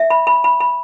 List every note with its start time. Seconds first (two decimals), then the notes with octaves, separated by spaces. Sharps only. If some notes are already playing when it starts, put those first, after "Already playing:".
Already playing: E5
0.10 B5
0.27 B5
0.44 B5
0.60 B5